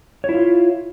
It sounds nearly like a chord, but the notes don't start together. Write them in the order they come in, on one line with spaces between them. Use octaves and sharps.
C#5 E4 F4